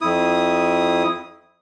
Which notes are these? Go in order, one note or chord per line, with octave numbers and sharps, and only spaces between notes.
F2 E4 D#6